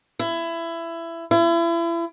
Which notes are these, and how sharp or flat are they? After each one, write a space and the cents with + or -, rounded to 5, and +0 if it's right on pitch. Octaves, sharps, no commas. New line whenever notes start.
E4 +20
E4 +35